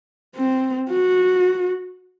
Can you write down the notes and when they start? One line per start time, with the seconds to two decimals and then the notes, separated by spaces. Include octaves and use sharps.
0.36 C4
0.90 F#4